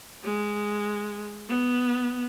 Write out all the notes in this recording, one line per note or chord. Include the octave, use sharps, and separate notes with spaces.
G#3
B3